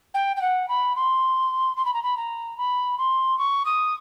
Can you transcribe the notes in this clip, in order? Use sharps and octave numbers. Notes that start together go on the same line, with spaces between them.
G5
G5
F#5
B5
C6
C6
B5
A#5
B5
A#5
B5
C6
C#6
D#6